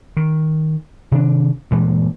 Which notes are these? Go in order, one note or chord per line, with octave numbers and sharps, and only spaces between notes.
D#3
C3 D#3 D4
G2 A#2 E3 G#3